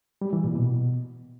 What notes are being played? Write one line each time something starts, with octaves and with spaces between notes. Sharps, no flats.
G3
E3
A#2
B2